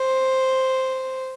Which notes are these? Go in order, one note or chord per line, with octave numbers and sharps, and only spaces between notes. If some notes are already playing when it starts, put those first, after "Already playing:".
Already playing: C5